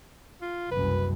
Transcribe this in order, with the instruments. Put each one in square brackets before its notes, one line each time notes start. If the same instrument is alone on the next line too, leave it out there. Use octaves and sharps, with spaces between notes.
[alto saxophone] F4
[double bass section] F#1 C2 F#2 [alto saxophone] B4